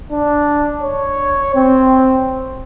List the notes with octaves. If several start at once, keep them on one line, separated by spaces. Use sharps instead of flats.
D4
C#5
C4